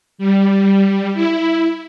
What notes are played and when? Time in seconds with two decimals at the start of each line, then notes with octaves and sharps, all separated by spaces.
0.18 G3
1.13 E4